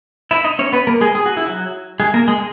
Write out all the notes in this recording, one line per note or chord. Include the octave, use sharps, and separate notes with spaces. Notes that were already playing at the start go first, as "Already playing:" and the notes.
E4 E5
D#4 D#5
C#4 C#5
B3 B4
A#3 A#4
G#3 G#4
G#4
F#4
E4
F#3 F#4
G#3 G#4
A#3 A#4
G#3 G#4